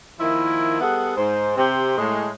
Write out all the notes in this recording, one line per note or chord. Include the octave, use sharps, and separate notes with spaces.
D#3 F3 A#3 E4
G3 B3 G#4 A4 F#5
G#2 C5
C3 C4 G4
A2 G#3